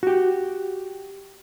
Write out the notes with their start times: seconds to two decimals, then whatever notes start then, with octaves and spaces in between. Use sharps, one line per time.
0.03 F#4 G4